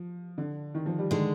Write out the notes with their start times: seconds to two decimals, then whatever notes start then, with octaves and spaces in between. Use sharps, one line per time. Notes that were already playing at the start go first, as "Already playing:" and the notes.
Already playing: F3
0.38 D3
0.75 D#3
0.86 F3
0.98 G3
1.11 D3 D#3 G#3